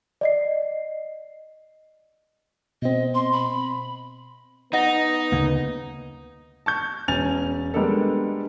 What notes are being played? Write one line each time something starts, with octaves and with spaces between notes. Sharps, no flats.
D5 D#5 C7
B2 C4 D#5
C6
B5
B3 D#4 D#5 F#5 A#6
D2 C#3 A#3
A5 C#6 G6
E1 C#4 G#5 A6 F7
G3 G#3 A#3 B3 D4 A4